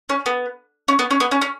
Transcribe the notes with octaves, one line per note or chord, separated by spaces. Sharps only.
C#4
B3
C#4
B3
C#4
B3
C#4
C#4